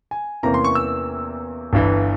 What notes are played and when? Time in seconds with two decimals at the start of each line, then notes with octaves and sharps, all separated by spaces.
0.11 G#5
0.43 E2 C3 E3 A#3 C#4 A#5
0.54 C6
0.64 C#6
0.75 E6
1.73 G1 G2 E3